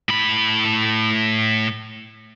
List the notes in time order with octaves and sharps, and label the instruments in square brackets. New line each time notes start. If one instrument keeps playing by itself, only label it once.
[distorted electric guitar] A2 B5